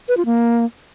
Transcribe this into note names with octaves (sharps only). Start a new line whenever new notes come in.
B4
F4
A#3